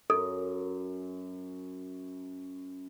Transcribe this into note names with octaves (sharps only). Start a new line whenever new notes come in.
F#2 A4